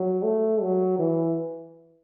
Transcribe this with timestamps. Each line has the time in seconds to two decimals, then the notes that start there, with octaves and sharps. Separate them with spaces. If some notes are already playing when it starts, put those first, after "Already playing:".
Already playing: F#3
0.23 A3
0.62 F#3
0.99 E3